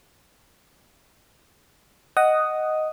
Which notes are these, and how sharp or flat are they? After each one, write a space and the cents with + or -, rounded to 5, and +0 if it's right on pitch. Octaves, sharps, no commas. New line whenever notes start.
D#5 +0 F#5 +10 D#6 +0